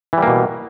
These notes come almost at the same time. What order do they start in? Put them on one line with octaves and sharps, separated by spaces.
E3 G3 A#3 B2